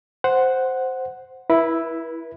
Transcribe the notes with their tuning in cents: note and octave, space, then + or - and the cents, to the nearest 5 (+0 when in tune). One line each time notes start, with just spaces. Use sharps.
C5 +0 F#5 +0
E4 +0 B4 -35